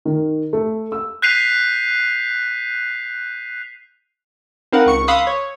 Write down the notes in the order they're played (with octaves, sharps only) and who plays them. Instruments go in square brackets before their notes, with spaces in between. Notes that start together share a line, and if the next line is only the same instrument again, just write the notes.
[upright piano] D#3
A3
E6
[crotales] F#6 G6 B6 C7 D#7 F7
[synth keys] C4 D#4 A#4 B4 F5 F#5
C#2 C#6 C#7
F5 B5 C6 D#6 E6 F#6
C#5